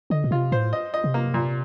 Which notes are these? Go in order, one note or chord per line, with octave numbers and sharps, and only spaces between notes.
D3 D#5
A#2
C3 F4
A2 C5
D#5
D#5
C3
A#3
A#2